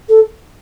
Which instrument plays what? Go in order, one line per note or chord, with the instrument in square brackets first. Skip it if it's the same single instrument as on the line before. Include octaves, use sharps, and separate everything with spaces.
[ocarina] A4